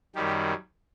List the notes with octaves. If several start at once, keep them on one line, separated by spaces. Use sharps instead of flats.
F#2 D#3 G3 G4